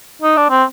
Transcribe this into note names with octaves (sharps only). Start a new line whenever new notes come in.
D#4
D4
C4